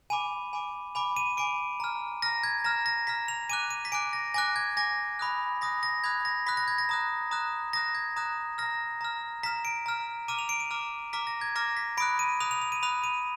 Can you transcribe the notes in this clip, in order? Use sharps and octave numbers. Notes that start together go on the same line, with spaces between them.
G#5 B5 D6 D#7
G#5 B5 D6
G#5 B5 D6 F7
D#7
G#5 B5 D6 D7
A#5 F6
A#5 F6 A#6
G#6
A#5 F6 A#6
A#6
A#5 F6 B6
F7
G#5 D6 F#6 D#7
D#7
B6
G#5 D6 F#6 D7
A#6
G#5 D6 F#6 A#6
G#6
G#5 D6 F#6 A#6
B5 D#6 F#6
B5 D#6 F#6 A#6
A#6
B5 D#6 F#6 G#6
A#6
B5 D#6 F#6 B6
A#6
G#6
A#6
A#5 D#6 F#6
A#5 D#6 F#6
A#5 D#6 F#6 A#6
G#6
A#5 D#6 F#6
A#5 F6 A#6
A#5 F6
A#5 F6 B6
D7
A#5 F6
A#5 D6 F6 D#7
F7
D7
D#7
A#5 D6 F6
A#5 D6 F6 B6
A#6
G#6
A#5 D6 F6 A#6
B6
B5 D#6 F#6 D7
D#7
B5 D#6 F#6 F7
F7
F7
D#7
B5 D#6 F#6 F7
D#7